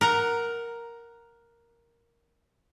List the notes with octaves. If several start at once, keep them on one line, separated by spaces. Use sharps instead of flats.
A#4 F#5 A#5